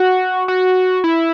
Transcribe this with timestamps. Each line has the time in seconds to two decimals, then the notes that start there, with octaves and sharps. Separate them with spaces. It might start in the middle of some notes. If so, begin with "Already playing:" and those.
Already playing: F#4
0.48 F#4
1.04 E4